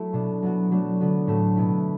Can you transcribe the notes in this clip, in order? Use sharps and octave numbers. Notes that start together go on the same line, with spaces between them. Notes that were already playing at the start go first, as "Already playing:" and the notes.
Already playing: F#3 A3 E4 F#4
B2 B3 D4
F#3 B3 F#4
F#3 A3 D4
D3 B3 F#4
A2 A3 F#4
B2 B3 E4